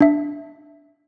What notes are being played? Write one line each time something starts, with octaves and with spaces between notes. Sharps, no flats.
D4 E5